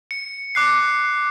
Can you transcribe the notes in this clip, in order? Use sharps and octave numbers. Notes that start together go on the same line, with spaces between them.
C#7
D6 F#6 C7